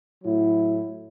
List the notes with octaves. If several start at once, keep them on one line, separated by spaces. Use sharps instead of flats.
A2 F#3 E4